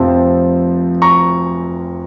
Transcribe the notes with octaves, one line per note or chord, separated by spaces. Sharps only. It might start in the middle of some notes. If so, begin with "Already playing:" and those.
Already playing: F1 F2 C3 F3 C4 A5
A#5 C#6